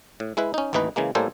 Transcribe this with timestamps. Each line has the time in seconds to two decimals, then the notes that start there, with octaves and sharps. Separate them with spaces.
0.20 A2
0.37 G#3 E4 B4
0.54 C#4 D#4
0.73 A1 D#2 E3 D#4 B4
0.96 C#3 E3 G#3 A#3
1.15 A2 G3 A#3 A4 C5 G#5